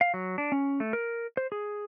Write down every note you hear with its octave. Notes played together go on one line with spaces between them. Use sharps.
F5
F#3
D4
C#4
A3
A#4
C5
G#4